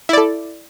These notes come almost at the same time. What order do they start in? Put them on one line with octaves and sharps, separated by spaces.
E4 D5 A4